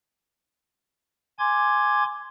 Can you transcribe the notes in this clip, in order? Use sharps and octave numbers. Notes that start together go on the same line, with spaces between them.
G#5 C6 D6 G#6